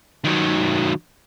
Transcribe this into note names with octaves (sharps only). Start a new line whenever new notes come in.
D#3 F#3